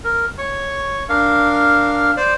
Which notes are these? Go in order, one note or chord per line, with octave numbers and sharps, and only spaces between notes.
A#4
C#5 C#6
D4 A#4 F5
C5 D5